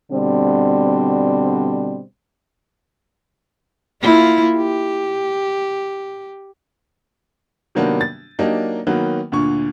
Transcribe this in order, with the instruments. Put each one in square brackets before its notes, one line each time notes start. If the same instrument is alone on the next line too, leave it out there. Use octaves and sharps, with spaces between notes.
[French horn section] B2 D3 G3 C4
[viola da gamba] A#3 E4 F4
G4
[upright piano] C3 D#3 F#3 A#3 B3 D4
A6
F#3 A#3 D4 D#4 G4
D#3 F#3 A#3 B3
D2 A#2 D3 C#6